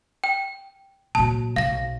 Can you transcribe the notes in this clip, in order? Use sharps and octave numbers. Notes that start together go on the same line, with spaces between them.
G5
A#2 F#3 A5
B1 F5 A#6